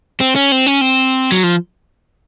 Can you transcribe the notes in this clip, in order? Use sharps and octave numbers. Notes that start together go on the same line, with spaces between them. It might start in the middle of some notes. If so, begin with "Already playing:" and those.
C4
C#4
C4
C#4
C4
F#3
F3